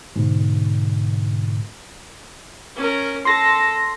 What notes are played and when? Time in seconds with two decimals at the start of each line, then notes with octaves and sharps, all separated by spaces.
0.16 G#2 B2 D3
2.76 C#4 A#4
3.25 A4 C6 A#6